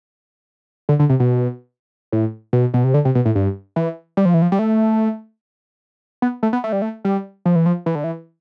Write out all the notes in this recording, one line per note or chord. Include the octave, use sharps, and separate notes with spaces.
D3
D3
C3
B2
A2
B2
B2
C3
D3
C3
B2
A2
G2
E3
G3
F3
E3
F3
G3
A3
B3
A3
B3
A3
G3
A3
G3
F3
E3
F3
E3
D3
E3